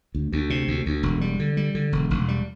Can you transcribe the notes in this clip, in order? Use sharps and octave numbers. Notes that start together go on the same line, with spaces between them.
D2
D2
C3
D2
D2
E1
G3
D3
G3
D3
E1
E1
G3